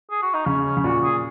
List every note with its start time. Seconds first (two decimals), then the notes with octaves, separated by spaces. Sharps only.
0.11 G#4
0.22 F#4
0.34 D#4
0.46 C#3 C#4
0.65 C#4
0.77 C#3
0.84 A#2 F#4
1.03 G#4